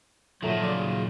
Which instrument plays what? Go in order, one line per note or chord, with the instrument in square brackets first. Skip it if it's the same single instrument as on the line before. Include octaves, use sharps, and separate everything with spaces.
[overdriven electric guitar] A#2 D#3 [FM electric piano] F3 A3 [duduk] F#3
[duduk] C#3 [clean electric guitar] F#3 [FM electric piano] D5